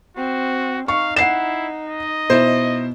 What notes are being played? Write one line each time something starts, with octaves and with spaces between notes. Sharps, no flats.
C4 F#4
D#4 F5 C#6
E4 F#5 C7 E7
D#5
B2 E4 C5